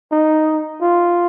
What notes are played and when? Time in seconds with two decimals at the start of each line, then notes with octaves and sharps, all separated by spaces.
0.12 D#4
0.81 F4